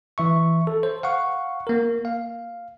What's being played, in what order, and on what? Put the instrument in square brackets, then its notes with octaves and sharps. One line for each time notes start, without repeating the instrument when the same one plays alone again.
[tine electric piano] E3 E5 C#6
A4
C5
F5 F#5 C#6
A#3 A#4
F5